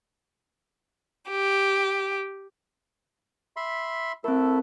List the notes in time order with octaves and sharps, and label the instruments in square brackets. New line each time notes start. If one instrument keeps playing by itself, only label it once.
[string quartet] G4
[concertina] E5 B5 C6
[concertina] A3 E4 A4 [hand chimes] C4 A#4